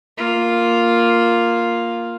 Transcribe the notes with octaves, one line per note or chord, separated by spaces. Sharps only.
A#3 F4